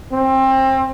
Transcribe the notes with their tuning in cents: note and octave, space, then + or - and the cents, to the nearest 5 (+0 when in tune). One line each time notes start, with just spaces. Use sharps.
C4 +25